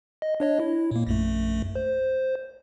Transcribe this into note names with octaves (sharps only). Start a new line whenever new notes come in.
D#5
D4 C#5 D#5
E4
A#2 A#3
A#1 F#2 A3
C5